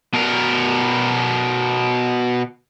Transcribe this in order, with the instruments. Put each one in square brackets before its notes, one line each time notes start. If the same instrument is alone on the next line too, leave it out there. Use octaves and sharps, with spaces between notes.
[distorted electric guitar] B2 A#4